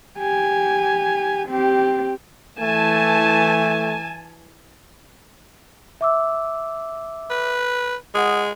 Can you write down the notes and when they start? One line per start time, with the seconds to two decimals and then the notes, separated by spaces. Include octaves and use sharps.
0.18 G4 G#5
1.49 C4 G4
2.60 E3 A3 G#5 A5
6.01 E5 D6 E6
7.30 B4
8.15 G#3 F#5 D#6